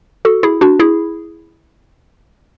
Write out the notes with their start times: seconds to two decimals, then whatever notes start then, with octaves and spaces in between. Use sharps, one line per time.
0.25 F#4 A4
0.43 E4 G#4
0.61 D4 F#4
0.80 E4 G#4